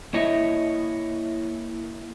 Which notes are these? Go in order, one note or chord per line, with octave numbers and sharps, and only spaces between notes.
A#3 E4 C#5 D#5 E5